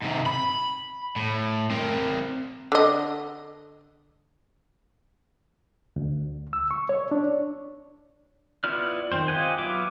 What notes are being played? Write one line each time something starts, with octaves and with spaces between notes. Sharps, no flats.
G#2 C3
B5
A2
C4 A#4
D3 D#5
D2
E6
C#6
C#5
D4
B3 E4 F4 D5 F6
D#3 G3 C4 C5
F4 G4 D#5 F#5 G#5
F#3 B3 F4 E5 D6